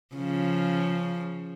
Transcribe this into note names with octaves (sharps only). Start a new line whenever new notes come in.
C#3 F3